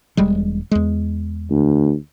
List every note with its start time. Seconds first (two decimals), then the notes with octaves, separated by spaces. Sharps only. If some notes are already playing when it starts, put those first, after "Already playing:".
0.17 E1 G3 G#3
0.71 E2 G#3
1.50 D2